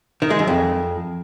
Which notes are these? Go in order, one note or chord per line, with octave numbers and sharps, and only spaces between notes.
D#3
G#3
F#2
F2